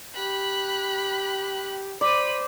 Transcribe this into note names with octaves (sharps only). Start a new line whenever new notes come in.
G4 B5 F#6
C5 D5 B5 D#7